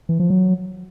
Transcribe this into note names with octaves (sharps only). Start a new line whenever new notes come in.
E3
F3
F#3